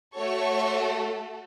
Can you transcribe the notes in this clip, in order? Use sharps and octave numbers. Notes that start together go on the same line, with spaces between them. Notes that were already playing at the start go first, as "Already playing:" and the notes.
A3 F#4 A4 C#5 C#6